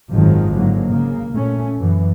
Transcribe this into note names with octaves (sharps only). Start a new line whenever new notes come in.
G#1 F#2 D#3 F3 F#3 G#3
G#2 D3 F#3 A#3
C#3 A#3
A#2 A3 C#4
F#2 E3